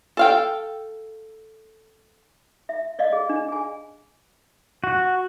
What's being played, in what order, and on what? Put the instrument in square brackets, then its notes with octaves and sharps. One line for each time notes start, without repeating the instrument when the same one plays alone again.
[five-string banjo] A4 F5 G5
[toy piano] E5
D5 D#5 F5
G#4
D4
G#4 G#5
[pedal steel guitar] F#4